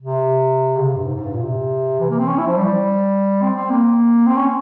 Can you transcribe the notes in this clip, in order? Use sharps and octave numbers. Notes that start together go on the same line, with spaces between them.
C3
C#3
C3
G2
G#2
G#2
G2
A#2
C3
E3
A#3
C4
C#4
E4
F3
G3
C4
C4
A#3
C4
C#4